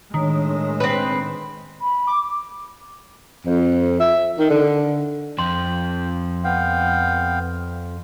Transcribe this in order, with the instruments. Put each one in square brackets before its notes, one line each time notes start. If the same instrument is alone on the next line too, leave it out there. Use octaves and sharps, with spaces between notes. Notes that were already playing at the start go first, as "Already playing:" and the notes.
[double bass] A2 G#3 [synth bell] D#3 [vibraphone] D4 C#5
[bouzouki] C4 B4
[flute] B5
[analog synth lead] D6
[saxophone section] F2
E5
D#3
D3
[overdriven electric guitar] F2 F3 [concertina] G5 [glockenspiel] C6
[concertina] B3 F5 G5